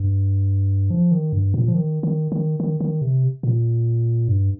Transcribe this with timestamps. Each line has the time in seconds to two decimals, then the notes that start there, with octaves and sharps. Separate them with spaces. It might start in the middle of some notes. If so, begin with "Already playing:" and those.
Already playing: G2
0.90 F3
1.12 D#3
1.33 G2
1.54 A#2
1.68 F3
1.75 D#3
2.03 D#3
2.32 D#3
2.60 D#3
2.80 D#3
3.01 C3
3.43 A#2
4.28 G2